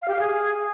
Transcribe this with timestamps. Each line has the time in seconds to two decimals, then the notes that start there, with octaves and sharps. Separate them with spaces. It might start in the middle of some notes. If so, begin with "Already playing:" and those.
0.03 F5
0.09 G4
0.14 F5
0.20 G#4